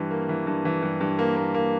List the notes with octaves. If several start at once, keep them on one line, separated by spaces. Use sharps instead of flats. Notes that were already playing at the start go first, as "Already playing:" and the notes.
Already playing: G2 E3
A#3
E3
G2
E3
G2
G2
A#3
A#3
A#3